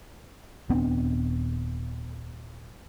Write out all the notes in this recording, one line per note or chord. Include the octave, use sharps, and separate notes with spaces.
D#1 B3 C4 D4